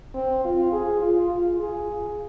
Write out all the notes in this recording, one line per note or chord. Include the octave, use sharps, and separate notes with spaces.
C4
F4
G#4
F4
F4
G#4